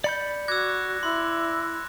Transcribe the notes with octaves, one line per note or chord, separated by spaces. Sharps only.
D5 B5 G6 C#7
F#4 D6 E6 F#6 G#6 A#6
E4 C6